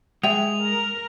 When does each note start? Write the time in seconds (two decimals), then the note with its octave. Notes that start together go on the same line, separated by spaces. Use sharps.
0.23 G#3 C5 E5 G5 F7
0.61 A#4